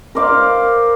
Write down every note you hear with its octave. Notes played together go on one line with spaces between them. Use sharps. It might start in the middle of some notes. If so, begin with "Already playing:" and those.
A#4 C5 D5 F5